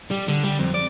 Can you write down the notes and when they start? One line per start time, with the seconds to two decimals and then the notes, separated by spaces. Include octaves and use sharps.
0.11 G3
0.29 D3
0.44 G3
0.59 F2
0.74 D5